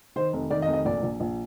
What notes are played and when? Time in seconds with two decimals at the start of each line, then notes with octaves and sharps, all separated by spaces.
0.16 D#3 C5
0.33 F1
0.50 D#3 D5
0.62 D#5
0.67 F1
0.73 D#5
0.85 A#1 D5
1.03 A#1
1.20 A#1